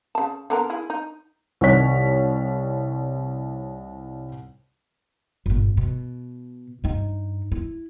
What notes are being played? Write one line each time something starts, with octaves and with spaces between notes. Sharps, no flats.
C#3 A5
D3 B3 A#4
E4 G#4
D#4
C2 D#3 C#5 B6
G1 A#2
B2
G2 D#4
E4